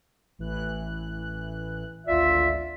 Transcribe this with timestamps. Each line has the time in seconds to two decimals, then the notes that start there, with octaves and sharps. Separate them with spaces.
0.39 A1 E3 F#6
2.07 G#1 D2 F4 D5 E5